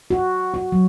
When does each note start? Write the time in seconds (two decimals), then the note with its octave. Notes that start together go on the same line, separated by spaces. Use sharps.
0.11 F#4
0.54 F#4
0.72 F#3